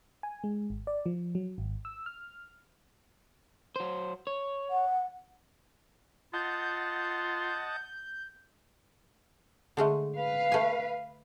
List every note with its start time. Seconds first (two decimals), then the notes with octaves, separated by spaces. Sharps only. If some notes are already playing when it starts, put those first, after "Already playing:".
0.23 G#5
0.44 G#3
0.70 G#1
0.87 D5
1.06 F3
1.35 F#3
1.58 G#1
1.85 E6
2.06 F6
3.76 F#3 C5
4.27 C#5
4.70 F#5
6.33 F4 D#5 F#5 A5 G6
9.77 D3 G#3 A3
10.18 B4 F5
10.52 A3 G#5